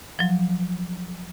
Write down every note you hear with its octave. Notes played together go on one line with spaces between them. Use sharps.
F3 F#3